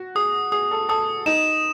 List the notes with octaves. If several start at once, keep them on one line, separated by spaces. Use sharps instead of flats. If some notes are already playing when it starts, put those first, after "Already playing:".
Already playing: F#4
G#4 D#6
G#4 D#6
A4
A4 D#6
D#4 E7